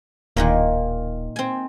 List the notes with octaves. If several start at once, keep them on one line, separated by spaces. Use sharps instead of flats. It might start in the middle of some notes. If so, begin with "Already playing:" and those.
D1 A#2 D#3 A#3
C4 G#5